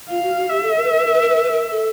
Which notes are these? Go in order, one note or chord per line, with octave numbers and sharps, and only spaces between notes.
F4 F5
F#4
F#4
G4 E5
A4
A#4
B4
A#4
B4
A#4
B4
A#4
B4
A#4
B4
A#4
A4